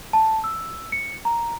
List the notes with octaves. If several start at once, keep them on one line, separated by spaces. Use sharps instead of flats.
A5
E6
C#7
A#5